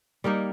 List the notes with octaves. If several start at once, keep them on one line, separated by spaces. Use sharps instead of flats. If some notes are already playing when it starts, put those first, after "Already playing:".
G3 A#3 D#4 A#4